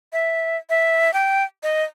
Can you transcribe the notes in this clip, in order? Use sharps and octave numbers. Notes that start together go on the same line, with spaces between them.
E5
E5
G5
D#5